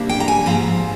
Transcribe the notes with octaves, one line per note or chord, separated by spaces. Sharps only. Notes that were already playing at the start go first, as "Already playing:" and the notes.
Already playing: C3 G3 A#3 D4
G5
A#5
G#5
G#2 F3 C4 A#5